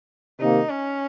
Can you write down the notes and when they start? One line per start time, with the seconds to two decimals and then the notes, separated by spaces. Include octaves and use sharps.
0.40 C3 D#3 A#3 D#4
0.69 C#4